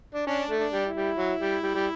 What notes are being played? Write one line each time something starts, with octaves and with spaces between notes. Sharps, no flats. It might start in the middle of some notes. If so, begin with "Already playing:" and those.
D4
C#4 D4
A3
D4
G3
E4
G3
F#3
G3
G3
G3